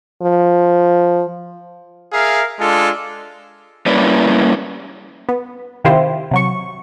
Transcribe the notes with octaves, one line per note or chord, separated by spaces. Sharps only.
F3
G#4 A#4 E5 F5
G#3 D4 F4 A4
G3 A#3 C#4 E4 B4 D5
B3
C3 D#3 E4 F4 G4 C5
C3 F#3 C#6